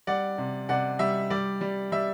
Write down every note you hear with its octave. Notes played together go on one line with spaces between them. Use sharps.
G3 D5 F#5
C3
C3 D5 F#5
G3 E5
G3 D5
G3
G3 E5